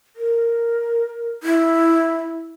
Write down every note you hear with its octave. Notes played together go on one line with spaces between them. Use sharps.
A#4
E4